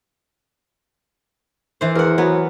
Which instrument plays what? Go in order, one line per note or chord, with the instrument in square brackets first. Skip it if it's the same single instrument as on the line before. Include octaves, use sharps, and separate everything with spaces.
[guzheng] E3 C5
[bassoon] E2 [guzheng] A#4 F#5
[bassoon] F#3 [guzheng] B3